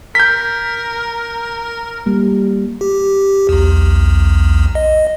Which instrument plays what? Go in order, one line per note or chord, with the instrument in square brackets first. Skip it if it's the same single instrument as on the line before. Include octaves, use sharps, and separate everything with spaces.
[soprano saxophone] A#4 [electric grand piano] G6 B6
[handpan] G3 A#3
[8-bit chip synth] G4
B1 E2
D#5